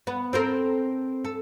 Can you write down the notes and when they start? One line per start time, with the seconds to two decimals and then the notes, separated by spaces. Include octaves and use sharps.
0.07 B3
0.33 C4 A4 A#4
1.25 A4